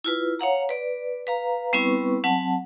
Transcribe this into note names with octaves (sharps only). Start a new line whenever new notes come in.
E4 F4 B4
C#5 F5 F#5 A#5
B4 D5
B4 F5 A#5
G3 B3 C4 E4 B4 C#6
F#3 C4 F#5 A5